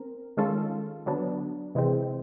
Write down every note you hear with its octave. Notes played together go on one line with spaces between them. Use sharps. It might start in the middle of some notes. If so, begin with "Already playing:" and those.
Already playing: C4 A#4
D#3 G#3 C#4 F4 A4
D3 F#3 B3 D4
C3 E3 G#3 C4